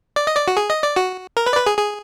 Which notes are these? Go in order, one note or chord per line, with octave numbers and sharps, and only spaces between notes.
D5
D#5
D5
F#4
G#4
D#5
D5
F#4
A#4
B4
D5
B4
G#4
G#4